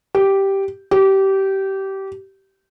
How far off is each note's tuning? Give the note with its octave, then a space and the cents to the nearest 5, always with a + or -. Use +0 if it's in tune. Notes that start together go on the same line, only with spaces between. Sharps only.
G4 -5
G4 -20